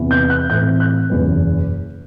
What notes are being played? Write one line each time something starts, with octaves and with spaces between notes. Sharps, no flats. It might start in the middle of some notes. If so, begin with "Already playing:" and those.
Already playing: E2 C3 E3 B3
G6
F#6
A2 E3 A3 C4 G6
F#6
F#1 E2 B2